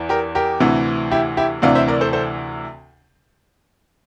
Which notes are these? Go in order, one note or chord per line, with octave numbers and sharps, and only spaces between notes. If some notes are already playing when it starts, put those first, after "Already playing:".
Already playing: E2 E3
G4 A#4
G4 A#4
D2 C3 E3
E4 G4
E4 G4
D2 C3 E3 D5 F5
C5 E5
A#4 D5
A4 C5
A4 C5